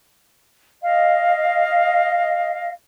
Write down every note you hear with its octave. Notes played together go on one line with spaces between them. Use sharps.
D#5 F5